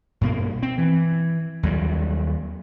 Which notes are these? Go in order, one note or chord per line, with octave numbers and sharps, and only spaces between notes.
G2 B2 A#3
C4
E3
D#2 F#3 G3